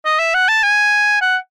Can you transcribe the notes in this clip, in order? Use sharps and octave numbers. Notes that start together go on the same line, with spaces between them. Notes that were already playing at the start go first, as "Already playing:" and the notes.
D#5
E5
F#5
A5
G#5
F#5